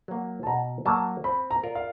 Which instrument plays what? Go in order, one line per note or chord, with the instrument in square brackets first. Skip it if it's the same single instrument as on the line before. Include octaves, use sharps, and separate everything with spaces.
[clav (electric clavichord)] F#3 A#3
[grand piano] A5
[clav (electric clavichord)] B2 [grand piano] A#5
[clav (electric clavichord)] F#3 A#3 [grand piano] A5
[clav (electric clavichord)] C4 [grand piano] B5
[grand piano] A#5
[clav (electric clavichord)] F4 A#4 D5
[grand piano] F5